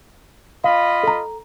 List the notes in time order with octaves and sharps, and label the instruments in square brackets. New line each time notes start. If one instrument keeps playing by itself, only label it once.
[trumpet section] F4 D#5 B5 [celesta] F5
[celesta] A4 A#5